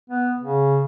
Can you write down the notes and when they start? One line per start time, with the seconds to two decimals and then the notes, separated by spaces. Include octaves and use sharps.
0.10 B3
0.39 C#3